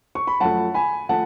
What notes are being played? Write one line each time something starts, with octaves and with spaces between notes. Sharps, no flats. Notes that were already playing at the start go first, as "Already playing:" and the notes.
C#6
B5
F#2 F3 A3 F#5 A5
G#5 B5
F3 A3 F#5 A5